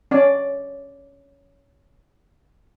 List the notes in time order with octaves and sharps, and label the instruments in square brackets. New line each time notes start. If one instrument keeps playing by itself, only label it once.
[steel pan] C#4 D5